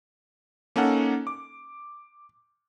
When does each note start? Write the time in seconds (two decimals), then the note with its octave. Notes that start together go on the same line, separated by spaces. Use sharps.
0.76 A#3 C#4 D#4 A4 F#5
1.27 D6